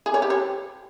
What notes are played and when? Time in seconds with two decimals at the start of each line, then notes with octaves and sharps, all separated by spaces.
0.06 G#4
0.14 C#5
0.22 G4
0.30 C#5